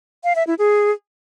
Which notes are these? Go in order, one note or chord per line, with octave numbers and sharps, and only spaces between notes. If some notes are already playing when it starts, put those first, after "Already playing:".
F5
E5
E4
G#4